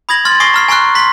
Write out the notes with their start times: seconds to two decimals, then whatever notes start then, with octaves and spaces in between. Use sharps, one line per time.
0.09 B5 D#6 G#6 A#6 F#7
0.25 C6 F6 A6 F#7
0.40 G#5 C#6 D#6 A#6 C7
0.54 A#5 F6 C7
0.68 G#5 A#5 C6 C#6 F6 F#6
0.95 C6 B6